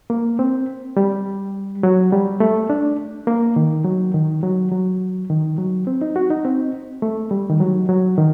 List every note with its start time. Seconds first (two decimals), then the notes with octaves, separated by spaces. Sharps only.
0.10 A#3
0.39 C4
0.97 G3
1.83 F#3
2.12 G3
2.40 A3
2.70 D4
3.27 A#3
3.56 D#3
3.85 F#3
4.14 D#3
4.43 F#3
4.72 F#3
5.30 D#3
5.58 F#3
5.87 C4
6.01 D#4
6.16 F#4
6.31 D#4
6.45 C4
7.02 A3
7.31 G3
7.50 D#3
7.60 F#3
7.89 F#3
8.18 D#3